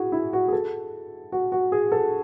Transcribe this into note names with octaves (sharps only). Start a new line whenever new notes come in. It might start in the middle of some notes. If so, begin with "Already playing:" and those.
Already playing: E4 F#4 G#4
E4
F#4
G#4
A4
F#4
F#4
G#4
A4